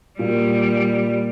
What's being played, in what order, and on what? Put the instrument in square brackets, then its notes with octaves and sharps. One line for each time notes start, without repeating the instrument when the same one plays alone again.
[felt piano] A#2 [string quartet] G3